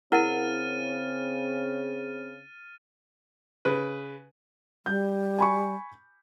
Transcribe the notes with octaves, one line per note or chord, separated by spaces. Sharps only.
C#3 C4 E4 A#4 F#5 F6 A6 D#7
C#3 B4
G3 G6
G#5 B5 C#6